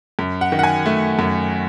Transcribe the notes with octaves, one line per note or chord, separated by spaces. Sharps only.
F#2
F#5
D#3
F#5
G#5
A3
F#2